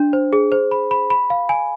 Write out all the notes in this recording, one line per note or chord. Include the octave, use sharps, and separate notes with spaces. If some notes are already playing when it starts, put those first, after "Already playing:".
Already playing: D4
C5
G#4
C5
B5
B5
B5
F5
G#5